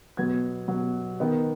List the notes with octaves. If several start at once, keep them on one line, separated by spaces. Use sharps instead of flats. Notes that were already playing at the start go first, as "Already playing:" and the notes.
B2 F#3 B3 G#6
B2 F#3 B3
D#3 B3 D#4